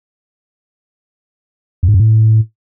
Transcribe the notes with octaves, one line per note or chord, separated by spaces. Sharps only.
F2
G#2
F#2
A2